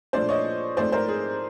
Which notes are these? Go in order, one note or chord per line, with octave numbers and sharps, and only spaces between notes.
A#2 F3 A3 D4 C5 D5
C#5 D#5
G#2 F3 A3 C4 C5 D5
A#4 C5
G#4